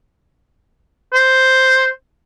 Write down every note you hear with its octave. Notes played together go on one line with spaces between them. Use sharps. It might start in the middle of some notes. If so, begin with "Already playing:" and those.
C5